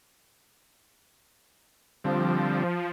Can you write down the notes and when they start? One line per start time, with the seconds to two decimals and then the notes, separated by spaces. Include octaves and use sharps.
2.04 D3 F3 G3 C4